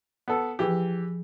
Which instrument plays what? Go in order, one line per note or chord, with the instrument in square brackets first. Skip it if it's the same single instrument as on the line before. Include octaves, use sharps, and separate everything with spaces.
[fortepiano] B3 A4
[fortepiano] E3 G4 [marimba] F3 G#4